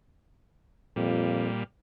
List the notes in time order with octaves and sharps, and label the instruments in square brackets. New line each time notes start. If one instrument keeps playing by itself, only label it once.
[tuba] F2 [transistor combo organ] A#2 G3